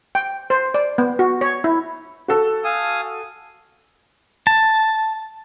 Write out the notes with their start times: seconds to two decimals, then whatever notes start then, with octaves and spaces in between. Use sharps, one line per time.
0.15 G5
0.50 C5
0.74 D5
0.98 B3
1.19 F#4
1.41 C#5
1.64 E4
2.28 F#4 A4
2.64 F5 G#5 D#6
4.47 A5